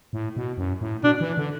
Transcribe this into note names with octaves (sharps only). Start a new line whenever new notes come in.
A2
B2
F#2
A2
B2 D4
E3
D3